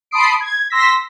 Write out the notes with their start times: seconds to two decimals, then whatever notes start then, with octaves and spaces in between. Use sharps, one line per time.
0.11 A5 B5 C6 D#6 C7 D7
0.40 G#6
0.70 C6 E6 A#6 B6